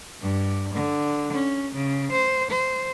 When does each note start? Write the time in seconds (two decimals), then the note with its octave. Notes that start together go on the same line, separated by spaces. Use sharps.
0.22 G2
0.74 D3
1.32 C#4
1.74 C#3
2.11 C5
2.50 C5